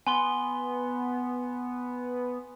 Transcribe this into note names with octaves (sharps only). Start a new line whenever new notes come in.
B3 G#5 C6 G7